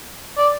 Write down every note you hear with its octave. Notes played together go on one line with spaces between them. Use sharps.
D5